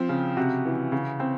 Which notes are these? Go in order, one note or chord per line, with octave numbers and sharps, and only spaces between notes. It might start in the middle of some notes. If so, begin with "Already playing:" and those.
Already playing: F3 C4
C#3
C3 F#4
E3
C#3
C4